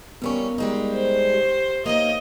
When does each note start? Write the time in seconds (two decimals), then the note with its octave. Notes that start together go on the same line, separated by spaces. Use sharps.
0.22 E2 G3 B3 C#4 A#4 C#6
0.58 G3 G#3 D#4
0.93 C5
1.34 G4
1.86 A#3 C#4 D#4 D#5